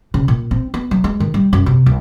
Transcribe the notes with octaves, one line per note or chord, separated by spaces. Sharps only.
C#3
A#2
C4
B3
F#3
G#3
D#3
G3
F#2
C3
C2